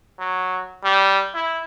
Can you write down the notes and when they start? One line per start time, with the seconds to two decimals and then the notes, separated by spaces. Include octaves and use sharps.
0.19 F#3
0.84 G3
1.34 E4